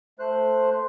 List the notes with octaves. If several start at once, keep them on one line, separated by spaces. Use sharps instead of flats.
A3 C5 F#6